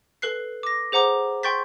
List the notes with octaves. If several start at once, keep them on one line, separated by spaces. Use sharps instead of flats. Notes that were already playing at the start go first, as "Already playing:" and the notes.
A4 B4 F#6 C7
D6 A#6
G#4 C5 F#5 A#5 D6
G5 C6 C#6 G6 A6 B6